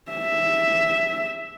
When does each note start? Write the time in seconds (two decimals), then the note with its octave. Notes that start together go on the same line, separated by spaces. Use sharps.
0.11 E5